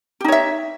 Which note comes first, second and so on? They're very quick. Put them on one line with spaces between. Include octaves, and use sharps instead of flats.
G4 D#4 C#5 E5